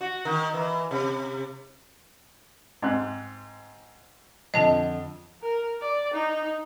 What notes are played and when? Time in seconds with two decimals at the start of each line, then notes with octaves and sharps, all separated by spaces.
0.01 F#4
0.25 D#3
0.54 E3
0.91 C3
2.82 G#2 C4 F#6
4.54 F2 D3 D#5 A5
5.42 A#4
5.81 D5
6.14 D#4